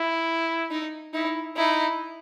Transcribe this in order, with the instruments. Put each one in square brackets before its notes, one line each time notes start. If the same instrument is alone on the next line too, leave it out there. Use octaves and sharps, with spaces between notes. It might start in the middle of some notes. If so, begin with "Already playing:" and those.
Already playing: [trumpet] E4
[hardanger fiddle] D#4
[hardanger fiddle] D#4 [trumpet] E4
[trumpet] D#4 [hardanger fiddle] E4